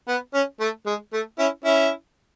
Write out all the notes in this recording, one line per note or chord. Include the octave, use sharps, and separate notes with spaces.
B3
C#4
A3
G#3
A3
C#4 E4
C#4 E4